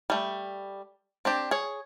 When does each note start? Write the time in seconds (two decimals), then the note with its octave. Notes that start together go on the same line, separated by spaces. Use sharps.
0.10 G3 A3
1.25 C4 D4 G4
1.51 G#4 C#5